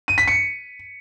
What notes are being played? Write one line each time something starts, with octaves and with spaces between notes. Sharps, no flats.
D#7
B6
C#7